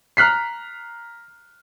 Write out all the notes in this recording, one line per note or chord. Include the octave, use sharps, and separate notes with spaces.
A#5 F6 F#6 B6 C7